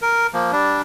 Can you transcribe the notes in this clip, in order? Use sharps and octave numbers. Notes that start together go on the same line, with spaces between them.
A#4
F3 A#3
G3 D4